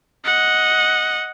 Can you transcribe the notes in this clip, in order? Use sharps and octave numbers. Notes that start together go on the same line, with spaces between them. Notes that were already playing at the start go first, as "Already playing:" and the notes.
D#5 F#5